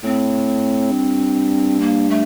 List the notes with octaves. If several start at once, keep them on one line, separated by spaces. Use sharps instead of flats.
A2 C4
G2
A#3
A3